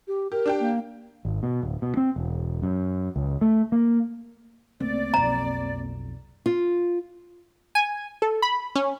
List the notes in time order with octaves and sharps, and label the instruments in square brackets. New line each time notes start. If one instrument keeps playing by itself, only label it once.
[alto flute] G4
[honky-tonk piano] G4 [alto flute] A#4
[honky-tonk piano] D4 G4 G5
[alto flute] A#3
[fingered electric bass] G#1
B2
D1
B2
C4
E1
F#2
C#2
A3
A#3
[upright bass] D2 C#3 [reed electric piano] A#3 C4 [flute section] D5
[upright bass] B1 F2 [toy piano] A#5
[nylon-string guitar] F4
[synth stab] G#5
A4
B5
C#4